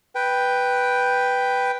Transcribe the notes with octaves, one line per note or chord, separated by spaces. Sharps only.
B4 G5